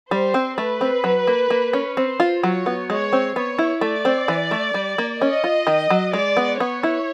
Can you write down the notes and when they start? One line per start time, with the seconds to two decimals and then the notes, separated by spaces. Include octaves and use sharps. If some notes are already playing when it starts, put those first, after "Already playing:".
0.11 G3 C5
0.34 C4
0.58 A3 B4
0.81 C4
1.04 F#3
1.27 A#3
1.50 A#3
1.73 C#4
1.97 C4 C5
2.20 F4
2.43 F#3 C#5
2.66 B3
2.89 G#3 C#5
3.13 C4
3.36 B3 C#5
3.58 E4
3.81 A3 D5
4.05 C4
4.28 E3
4.51 A3
4.74 G3
4.98 A#3
5.21 C#4 D#5
5.44 F4
5.67 D#3
5.90 F#3
6.13 G#3 D5
6.37 B3
6.60 B3 C#5
6.83 E4